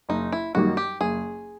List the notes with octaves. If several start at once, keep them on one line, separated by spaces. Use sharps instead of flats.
F#1 D#4
E4
F#2 D#3 G3 A#3 F#4
G4
F#1 G#4